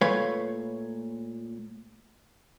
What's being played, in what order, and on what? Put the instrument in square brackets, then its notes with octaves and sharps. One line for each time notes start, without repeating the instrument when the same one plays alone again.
[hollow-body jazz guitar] A#2 A3 B4 C#5 F5